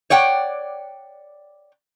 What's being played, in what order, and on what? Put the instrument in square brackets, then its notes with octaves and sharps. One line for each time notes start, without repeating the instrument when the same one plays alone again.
[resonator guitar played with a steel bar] C#5 D5 F#5 G5